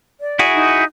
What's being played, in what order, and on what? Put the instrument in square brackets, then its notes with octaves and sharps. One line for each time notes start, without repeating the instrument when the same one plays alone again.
[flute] D5
[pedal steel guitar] E4 F#4 G#4
[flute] D#4